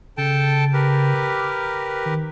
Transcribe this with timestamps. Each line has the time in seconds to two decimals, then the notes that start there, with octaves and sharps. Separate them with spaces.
0.18 C#3 A4 G5 A5
0.73 G4 A#4 B4
1.14 D6
2.06 D#3